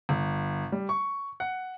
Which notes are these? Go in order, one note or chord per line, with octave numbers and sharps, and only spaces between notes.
G1
G3
C#6
F#5